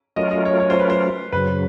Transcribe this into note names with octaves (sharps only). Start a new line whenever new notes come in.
F#3 A3 C#4 F4 A#4 D#5
D#5
C#5
C#5
C5
B4
C5
F#2 C#3 F#3 B4